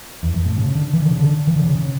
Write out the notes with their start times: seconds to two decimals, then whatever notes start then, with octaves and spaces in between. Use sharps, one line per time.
0.23 E2
0.34 F#2
0.46 A2
0.58 C#3
0.75 D3
0.93 E3
1.02 D3
1.11 C#3
1.20 D3
1.47 E3
1.56 D3
1.64 C#3
1.75 C#3